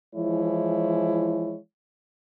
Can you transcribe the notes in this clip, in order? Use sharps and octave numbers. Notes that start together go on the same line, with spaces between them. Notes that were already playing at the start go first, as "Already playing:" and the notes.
E3 F3 G#3 E4 C#5